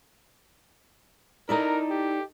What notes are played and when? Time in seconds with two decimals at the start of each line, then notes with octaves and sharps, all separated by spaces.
1.49 D#4 E4 A4 A#4 D5 A#5
1.90 G4